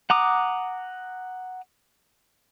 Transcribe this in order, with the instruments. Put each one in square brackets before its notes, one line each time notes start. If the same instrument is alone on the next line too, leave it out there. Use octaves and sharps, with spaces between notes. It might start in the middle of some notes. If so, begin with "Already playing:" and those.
[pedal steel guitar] F#5 A#5 D6 D#6